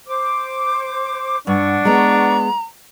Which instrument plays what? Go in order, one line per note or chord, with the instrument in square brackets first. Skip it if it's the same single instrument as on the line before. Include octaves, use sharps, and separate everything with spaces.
[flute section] C5 D6
[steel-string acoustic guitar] G2 [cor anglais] D4 [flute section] F#5 C#6
[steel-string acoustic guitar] G#3 B3 [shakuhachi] A#5